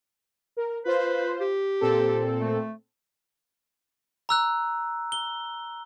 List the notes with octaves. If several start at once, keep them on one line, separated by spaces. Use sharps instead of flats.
A#4
F4 B4 C5
G4
A#2 C4 A4
A3
A#5 E6 F#6
G7